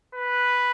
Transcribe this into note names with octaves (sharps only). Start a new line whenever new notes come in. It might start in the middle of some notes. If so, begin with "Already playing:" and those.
B4